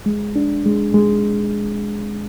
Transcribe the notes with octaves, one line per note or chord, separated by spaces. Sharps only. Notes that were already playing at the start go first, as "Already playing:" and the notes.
G#3
D4
G#3
G#3